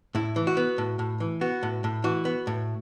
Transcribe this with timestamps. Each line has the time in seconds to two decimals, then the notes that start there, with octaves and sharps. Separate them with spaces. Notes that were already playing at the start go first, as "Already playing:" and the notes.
0.15 A2 E4
0.36 E3
0.47 F#4
0.57 B3
0.78 A2
0.99 A2
1.20 E3
1.41 B3 F#4
1.63 A2
1.84 A2
2.04 E3 F#4
2.25 B3
2.47 A2